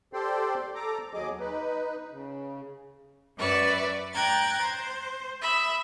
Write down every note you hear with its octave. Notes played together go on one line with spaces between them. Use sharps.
G4 A4 C5 D5 G5 C6
A4 A#5 D6
D#2 F#3 G#4 D#5 D6
D#4 B4
C#3
F#2 B4 D5 E5 C#6
G5 A#5 F#6 G#6 A6
C5
E5 B5 D#6